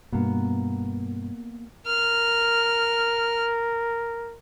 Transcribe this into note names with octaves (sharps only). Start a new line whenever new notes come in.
G2 B2 A#3 B3
A#4 F6